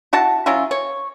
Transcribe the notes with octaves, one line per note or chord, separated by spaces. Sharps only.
E4 F#4 F#5 A5
F#3 C#4 E4 F4
C#5